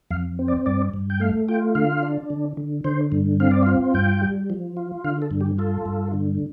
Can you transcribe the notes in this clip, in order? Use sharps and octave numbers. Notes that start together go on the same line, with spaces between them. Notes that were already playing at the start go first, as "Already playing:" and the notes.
F2 F5
C4
D5
G2 D5
G2
G5
A3 F5
F4 G5
D3 F5
D4
D3
D3
D3 C5
G2
C4 F5
D5
F4 F5
G2 G5
G3
F3
F4
D3 F5
A4
G2
G4
F4 A4
G2
D3